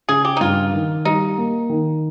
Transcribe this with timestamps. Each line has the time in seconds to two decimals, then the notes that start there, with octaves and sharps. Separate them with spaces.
0.09 C#3 G#4
0.25 G4
0.37 D#4
0.41 G2 F4
0.73 D#3
1.05 G3 D#4
1.38 A#3
1.70 D#3